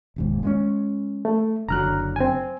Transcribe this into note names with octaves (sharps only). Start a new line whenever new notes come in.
E1 D#2 G#2
G#3 A#3 C#4
A3
F#1 D3 F#3 A#5 F6 F#6
C4 G#5